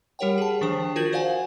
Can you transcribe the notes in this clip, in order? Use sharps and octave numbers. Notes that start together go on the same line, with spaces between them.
G3 G4 A#4 C#5 F#5 G5
G#4 A5
D#3 F3 D4 C5
F4 F#4 A#4 G6 G#6 F#7
C5 D5 F5 F#5 G#5